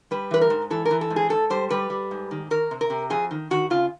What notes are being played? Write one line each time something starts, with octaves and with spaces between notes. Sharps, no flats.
G3 B4
E3 B4
A#4
G#2
E3 A4
A#4
E3
A4
G#2
G#4
G#2 A4
G3 C5
G3 B4
G3
G#2
D#3
D#3 A#4
C3
A#4
C3
F2 G#4
D#3
D#3 F#4
C#3 F4